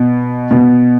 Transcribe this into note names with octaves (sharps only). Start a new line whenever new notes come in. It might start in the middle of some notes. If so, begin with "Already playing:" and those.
Already playing: B2
B2